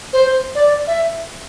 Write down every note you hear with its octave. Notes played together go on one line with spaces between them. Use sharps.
C5
D5
E5